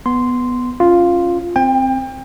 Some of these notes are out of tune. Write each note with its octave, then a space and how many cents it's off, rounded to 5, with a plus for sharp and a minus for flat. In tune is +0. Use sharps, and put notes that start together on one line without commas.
B3 +0 C6 -5
C#4 +0 F4 +0
C4 +0 G5 +30